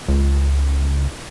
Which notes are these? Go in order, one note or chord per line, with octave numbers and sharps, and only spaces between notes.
C#2